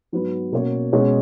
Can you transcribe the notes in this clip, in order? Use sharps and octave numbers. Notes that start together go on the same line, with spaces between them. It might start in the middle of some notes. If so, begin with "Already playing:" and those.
G#2 F#3 B3 F#4 B4
B2 A#3 C#4 F#4 C#5
B2 G#3 C#4 G#4 C#5